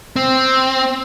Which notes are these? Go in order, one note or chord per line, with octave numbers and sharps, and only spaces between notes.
C4